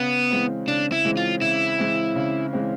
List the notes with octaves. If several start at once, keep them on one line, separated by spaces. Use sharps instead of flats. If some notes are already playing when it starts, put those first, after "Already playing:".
Already playing: C#3 B3
E3 G#3 C4
C#3 D4
E4
E3 G#3 C4
F4
C#3 E4
E3 G#3 C4
C#3
E3 G#3 C4